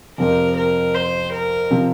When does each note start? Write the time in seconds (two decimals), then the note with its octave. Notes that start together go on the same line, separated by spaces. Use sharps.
0.18 F2 C3 F3 C4 G4 A#4
0.57 A#4
0.95 C5
1.33 A#4
1.71 C3 F3